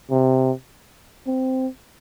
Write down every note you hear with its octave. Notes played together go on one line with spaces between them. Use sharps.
C3
C4